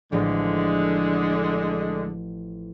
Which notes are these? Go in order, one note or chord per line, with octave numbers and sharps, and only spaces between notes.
A1 D3 F3 G#3